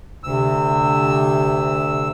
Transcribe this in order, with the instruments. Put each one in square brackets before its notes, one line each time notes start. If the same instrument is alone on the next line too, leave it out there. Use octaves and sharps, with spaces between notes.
[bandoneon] D2 E6 [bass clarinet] C3